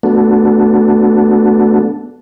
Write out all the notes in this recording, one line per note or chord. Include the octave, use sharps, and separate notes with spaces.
A3 B3 D4 F#4 A4